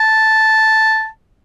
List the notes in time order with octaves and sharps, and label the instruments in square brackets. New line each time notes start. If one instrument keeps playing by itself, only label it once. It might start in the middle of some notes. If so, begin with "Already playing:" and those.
Already playing: [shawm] A5